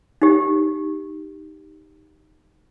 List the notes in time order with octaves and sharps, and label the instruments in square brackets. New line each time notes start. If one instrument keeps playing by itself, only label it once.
[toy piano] D#4 G4